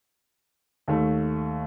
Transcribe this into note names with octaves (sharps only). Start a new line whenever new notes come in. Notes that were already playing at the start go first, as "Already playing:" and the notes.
D#2 A3